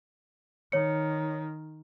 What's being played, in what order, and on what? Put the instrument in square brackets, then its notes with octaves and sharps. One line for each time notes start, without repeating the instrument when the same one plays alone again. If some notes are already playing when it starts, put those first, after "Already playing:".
[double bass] D#3 [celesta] C#5 C#7